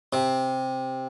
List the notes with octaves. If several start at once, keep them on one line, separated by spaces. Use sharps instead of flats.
C3